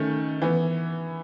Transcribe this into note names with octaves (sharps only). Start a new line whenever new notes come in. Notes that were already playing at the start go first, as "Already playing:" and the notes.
Already playing: D#3 A3 C#4
E3 B3